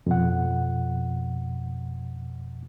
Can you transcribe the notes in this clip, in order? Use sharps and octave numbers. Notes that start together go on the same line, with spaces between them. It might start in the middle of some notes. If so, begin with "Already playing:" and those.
F2 B2 F3 F#5